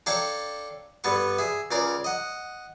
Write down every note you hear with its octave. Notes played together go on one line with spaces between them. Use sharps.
D4 A4 C#5 F5 G5 A#5
G2 B3 A4 B4 C#6
G#4 E5
C#2 C#3 A#4 D5 A#5
D#5 F#5